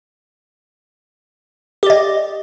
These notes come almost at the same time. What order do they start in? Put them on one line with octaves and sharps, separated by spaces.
G4 D5 D#5